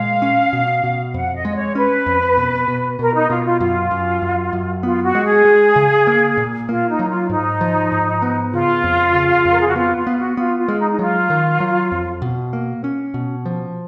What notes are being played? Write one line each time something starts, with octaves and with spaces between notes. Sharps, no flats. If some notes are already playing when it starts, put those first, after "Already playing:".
Already playing: A#2 G#3 F5
C#4
B2
B2
F2 F#5
D#5
G#3
C#5
C#4 B4
F2
B2
B2
B2 A#4
D#4
B2 F4
F4
F#2 F4
F#2
F#2
F#2
B3 F4
F#4
G#3
G#4
G#3
C#3
A#3
A#2
A#3 F4
D#4
F#3
F4
G#2 D#4
F3
G#2
B3
C#3 F4
F2
C#3
F2
A#4
G#4
F#4
B3 F4
F4
B3
F#4
B3 F4
F4
G#3
D#4
D#4
F#3 F4
D#3
F#3
F2
B2
A#3
C#4
B2
F3